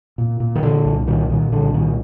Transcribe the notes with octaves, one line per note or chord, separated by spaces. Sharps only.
A#2
A#2
D#3
A#2 D3
C2
A#2 D#3
A#2 D#3
C2 D3
A#2 D#3